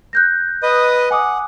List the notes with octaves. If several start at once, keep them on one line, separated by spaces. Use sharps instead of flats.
F#6 G6 A#6
B4 D#5 D#6
F#5 G#5 D6 D#6